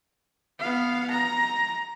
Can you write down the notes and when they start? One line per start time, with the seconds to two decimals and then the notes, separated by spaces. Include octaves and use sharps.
0.59 B3 F5
1.11 A#5